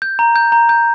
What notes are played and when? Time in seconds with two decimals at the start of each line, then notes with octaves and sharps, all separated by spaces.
0.02 G6
0.19 A#5
0.36 G6
0.52 A#5
0.69 G6